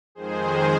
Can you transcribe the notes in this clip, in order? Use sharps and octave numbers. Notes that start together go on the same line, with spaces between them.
F2 D#3 G#3 G#4 C5